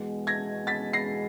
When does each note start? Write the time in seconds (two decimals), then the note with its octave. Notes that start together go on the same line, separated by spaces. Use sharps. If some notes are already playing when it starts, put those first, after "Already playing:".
Already playing: E2 B2 G#3
0.27 G#6 A#6
0.67 A6 B6
0.93 A#6 C7